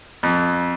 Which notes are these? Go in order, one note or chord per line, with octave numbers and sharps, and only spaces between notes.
F2